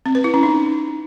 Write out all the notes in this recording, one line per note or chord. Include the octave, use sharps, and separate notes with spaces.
C4
B4
E4
C#4
D#4